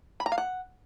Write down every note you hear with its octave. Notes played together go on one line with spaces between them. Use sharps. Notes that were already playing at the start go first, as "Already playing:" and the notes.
B5
A#5
F5
F#5